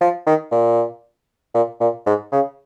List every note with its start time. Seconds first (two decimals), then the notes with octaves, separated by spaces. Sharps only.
0.01 F3
0.27 D#3
0.52 A#2
1.54 A#2
1.81 A#2
2.06 G#2
2.32 C#3